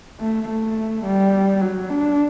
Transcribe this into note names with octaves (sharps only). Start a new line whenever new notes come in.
A3
A3
G3
F#3
D4